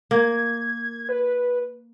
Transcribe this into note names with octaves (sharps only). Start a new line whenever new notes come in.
A#3 G#6
B4